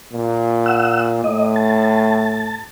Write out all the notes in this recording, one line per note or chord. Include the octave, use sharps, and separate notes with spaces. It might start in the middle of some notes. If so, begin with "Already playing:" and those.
A#2
F#5 E6
A2 D#5
A5